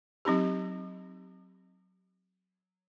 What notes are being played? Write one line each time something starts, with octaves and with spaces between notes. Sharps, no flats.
F#3 C4 D#4 G4